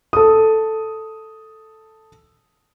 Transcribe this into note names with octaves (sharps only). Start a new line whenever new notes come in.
A4 D#6